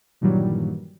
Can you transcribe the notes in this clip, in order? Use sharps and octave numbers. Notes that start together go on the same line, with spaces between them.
G2 A#2 D#3 E3 F#3 G3